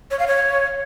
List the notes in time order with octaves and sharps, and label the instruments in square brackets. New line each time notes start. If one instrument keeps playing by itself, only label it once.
[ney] C#5
F5
C#5